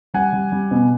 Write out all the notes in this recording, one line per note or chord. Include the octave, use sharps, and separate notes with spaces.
G3 F#5 G#5
G3
G3
B2